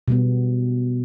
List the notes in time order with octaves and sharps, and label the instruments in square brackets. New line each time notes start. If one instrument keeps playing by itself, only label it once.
[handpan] B2 G3 B3